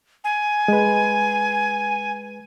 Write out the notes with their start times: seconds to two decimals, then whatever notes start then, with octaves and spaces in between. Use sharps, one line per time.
0.24 G#5
0.68 G#3 B4